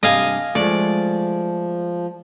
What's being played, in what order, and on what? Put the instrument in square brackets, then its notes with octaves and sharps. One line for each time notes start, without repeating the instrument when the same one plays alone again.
[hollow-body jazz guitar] G2 C3 [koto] D#5 F5 G#5
[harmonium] F3 [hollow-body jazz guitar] G#3 A3 [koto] D5